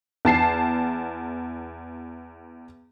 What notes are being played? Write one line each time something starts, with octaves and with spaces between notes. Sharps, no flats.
E2 A5 C7